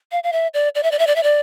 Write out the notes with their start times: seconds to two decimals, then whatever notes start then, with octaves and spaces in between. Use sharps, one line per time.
0.12 F5
0.24 F5
0.32 E5
0.54 D5
0.75 D5
0.83 E5
0.91 D5
0.99 E5
1.07 D5
1.16 E5
1.23 D5